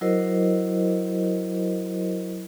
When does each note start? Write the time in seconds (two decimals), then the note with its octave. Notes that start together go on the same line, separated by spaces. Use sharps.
0.01 F#3 E4 F#4 A#4 C5 D#5